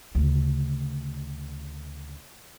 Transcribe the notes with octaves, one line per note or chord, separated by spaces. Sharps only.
D2 C#3